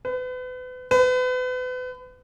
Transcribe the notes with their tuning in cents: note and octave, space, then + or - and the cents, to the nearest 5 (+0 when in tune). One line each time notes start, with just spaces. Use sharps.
B4 +35
B4 +35